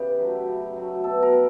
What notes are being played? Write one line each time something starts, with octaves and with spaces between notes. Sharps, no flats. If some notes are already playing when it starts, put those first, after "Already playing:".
Already playing: C#3 E3 G4 B4
F#3 A3
C#3
F#3 A3
B2 A4
A#4
G3